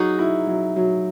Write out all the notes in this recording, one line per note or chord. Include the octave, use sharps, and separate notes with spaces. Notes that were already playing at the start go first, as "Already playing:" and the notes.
Already playing: F#3 D#4 F#4 G#4
E4
F#3
F#3